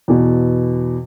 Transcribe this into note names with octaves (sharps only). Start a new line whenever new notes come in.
E2 B2